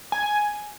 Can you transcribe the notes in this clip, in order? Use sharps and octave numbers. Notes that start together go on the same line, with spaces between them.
G#5